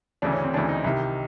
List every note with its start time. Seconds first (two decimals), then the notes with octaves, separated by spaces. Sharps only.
0.22 D2 C#3 E3 D4
0.32 C#4
0.44 C4
0.53 D2 C#3 E3 D4
0.69 D#4
0.84 C2 C3 D#3 E4